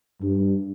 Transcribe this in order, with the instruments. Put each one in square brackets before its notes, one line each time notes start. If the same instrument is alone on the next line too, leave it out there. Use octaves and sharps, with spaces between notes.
[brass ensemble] G2